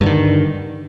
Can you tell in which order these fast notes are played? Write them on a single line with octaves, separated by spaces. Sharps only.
G2 D3 D#3